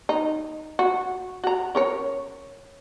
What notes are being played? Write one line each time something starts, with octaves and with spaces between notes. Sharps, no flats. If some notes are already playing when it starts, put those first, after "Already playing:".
D#4
F#4
F#4 A#5
C#4 A#4 C#5